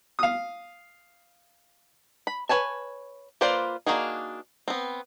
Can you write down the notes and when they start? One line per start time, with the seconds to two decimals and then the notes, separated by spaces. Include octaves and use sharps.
0.19 F5 D#6
2.27 B5
2.49 B4 C#5 G#5 A5
3.41 A#3 F4 B4 C5 D5
3.86 A#3 D4 D#4 F#4 G#4
4.68 B3 C4